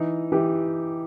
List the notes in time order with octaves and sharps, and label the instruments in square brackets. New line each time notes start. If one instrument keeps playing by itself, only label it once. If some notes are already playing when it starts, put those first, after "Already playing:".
Already playing: [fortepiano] E3 D#4
E3 G4